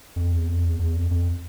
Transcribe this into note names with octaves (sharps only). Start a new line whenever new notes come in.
F2
E2
F2
E2
E2
F2
F2